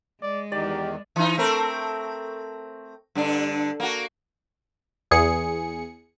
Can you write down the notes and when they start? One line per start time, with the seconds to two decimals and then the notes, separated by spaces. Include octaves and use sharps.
0.22 G#3 D5
0.52 E2 D#3 G4 D5
1.16 E3 D#4
1.38 A3 C4 A#4
3.15 G2 D3 D4
3.80 A#3 F#4
5.11 E2 G#4 C#7